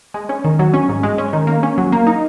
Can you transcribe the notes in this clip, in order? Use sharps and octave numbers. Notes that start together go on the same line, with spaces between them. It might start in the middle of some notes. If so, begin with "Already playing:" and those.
G#3
C#4
D#3
F#3
C#4
G#2
G#3
C#4
D#3
A#3
C#4
F#3
A#3
D#4